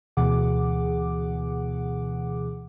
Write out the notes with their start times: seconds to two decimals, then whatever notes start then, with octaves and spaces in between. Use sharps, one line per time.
0.17 D2 B2 E3 G#4 F#5 D6